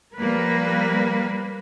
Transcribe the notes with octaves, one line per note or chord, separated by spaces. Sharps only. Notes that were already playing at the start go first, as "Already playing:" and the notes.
F3 G3 A#3 A#4 B4